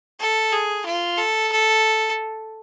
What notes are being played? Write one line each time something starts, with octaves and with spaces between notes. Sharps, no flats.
A4
G#4
F4
A4
A4